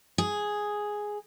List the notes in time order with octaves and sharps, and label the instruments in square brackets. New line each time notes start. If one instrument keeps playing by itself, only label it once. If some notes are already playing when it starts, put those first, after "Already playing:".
[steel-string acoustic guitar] G#4